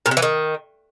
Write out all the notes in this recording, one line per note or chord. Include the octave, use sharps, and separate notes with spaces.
A#2
C3
E3
D#3